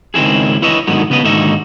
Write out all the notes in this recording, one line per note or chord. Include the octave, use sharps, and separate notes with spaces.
C#2 D#3 C4 E4 G#4
E4 B4 C#5 D#5 E5
G#2 D3 D#3 F#3 B3
C#3 B3 B4 D5 D#5
D#2 G#2 D3 D#4 F#4 E5